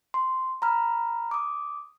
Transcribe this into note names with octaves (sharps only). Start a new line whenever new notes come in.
C6
A#5 B5 F6
D6 D#6